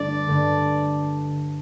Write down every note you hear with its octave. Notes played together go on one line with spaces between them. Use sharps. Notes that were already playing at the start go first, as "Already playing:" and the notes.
Already playing: G2 D3 A3 D5
G2 D3 A3